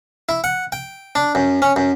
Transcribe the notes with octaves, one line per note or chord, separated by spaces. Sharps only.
E4
F#5
G5
D4
F#2
C#4
F#2